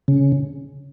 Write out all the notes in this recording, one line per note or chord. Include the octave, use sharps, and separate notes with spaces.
C#3